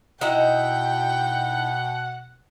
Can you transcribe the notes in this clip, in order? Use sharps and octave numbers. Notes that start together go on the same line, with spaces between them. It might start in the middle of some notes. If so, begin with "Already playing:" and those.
B2 D#4 E4 F#5 G5 A#5